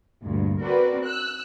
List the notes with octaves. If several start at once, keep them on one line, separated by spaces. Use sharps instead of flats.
D2 G2 A#2
C4 F#4 A#4 B4 D5
E6 F#6